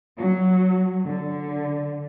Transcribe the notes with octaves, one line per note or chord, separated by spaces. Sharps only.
F#3
D3